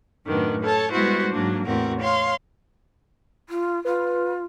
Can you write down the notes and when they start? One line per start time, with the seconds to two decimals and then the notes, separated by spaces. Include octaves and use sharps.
0.25 F#2 A2 D#3 B3 D4
0.62 A4 C#5 A5
0.92 G3 G#3 B3 E4 F#4 C5
1.30 G#2 F#3 A#3 D4
1.65 E2 A2 C4 F#4 A#4
1.99 C#5 F5 C6
3.49 F4
3.85 F4 B4